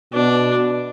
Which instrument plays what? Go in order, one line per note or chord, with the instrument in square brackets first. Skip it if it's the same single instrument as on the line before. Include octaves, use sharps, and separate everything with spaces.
[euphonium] B2 [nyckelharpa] D4